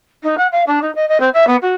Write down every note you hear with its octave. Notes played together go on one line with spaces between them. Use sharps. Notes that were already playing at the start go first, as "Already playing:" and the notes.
D#4
F#5
F5
D4
D#4
D#5
D#5
C4
E5
B3
F#4